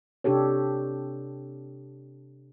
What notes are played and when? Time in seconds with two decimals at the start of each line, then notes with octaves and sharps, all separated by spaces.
0.24 C3 D4 G4 A4 C#5